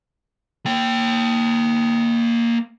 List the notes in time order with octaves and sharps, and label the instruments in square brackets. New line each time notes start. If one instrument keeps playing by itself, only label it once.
[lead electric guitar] A#3 G5